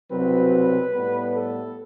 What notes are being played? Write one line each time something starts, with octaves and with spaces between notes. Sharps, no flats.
C2 B2 F#3 C4 B4
A2 G3 B3
A4